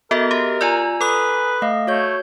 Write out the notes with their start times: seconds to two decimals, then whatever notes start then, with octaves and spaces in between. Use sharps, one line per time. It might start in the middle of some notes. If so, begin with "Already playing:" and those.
0.11 B3 F#4 A4 A#4 D#5 E5 A6
0.31 G4
0.61 F4 D5 G#5 A#5 E6
1.01 A4 B4 D#6
1.62 A3 D#5 F5
1.87 A3 F#4 C#5 G6